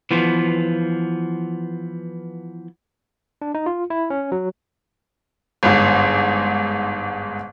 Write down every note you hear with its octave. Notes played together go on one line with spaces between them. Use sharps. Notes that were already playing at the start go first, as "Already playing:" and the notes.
E3 F3 B3 F4
D4
D#4
F4
E4
C#4
F#3
G1 G#2